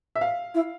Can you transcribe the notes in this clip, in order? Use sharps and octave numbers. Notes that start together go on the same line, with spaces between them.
E5
F5
E4